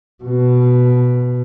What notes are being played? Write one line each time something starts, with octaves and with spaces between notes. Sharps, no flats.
B2